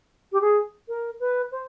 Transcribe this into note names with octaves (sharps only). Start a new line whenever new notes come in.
G4
G#4
A#4
B4
C5